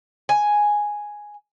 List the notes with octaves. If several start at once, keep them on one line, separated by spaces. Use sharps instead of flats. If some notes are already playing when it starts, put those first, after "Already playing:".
G#5